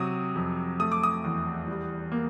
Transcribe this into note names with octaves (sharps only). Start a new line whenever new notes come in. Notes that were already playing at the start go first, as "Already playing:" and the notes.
Already playing: C3 F#3 D#6
F2
A3 D#6
D6
D#6
E2
G3
A#3